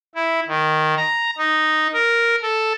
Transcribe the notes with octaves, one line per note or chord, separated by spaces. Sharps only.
E4
D#3
A#5
D#4
A#4
A4